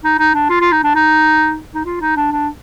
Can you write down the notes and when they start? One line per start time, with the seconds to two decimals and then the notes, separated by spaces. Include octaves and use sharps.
0.04 D#4
0.19 D#4
0.34 D4
0.49 F4
0.60 F4
0.71 D#4
0.83 D4
0.95 D#4
1.74 D#4
1.85 F4
2.01 D#4
2.16 D4
2.32 D4